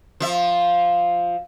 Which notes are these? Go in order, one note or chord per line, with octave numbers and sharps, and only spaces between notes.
F3 E5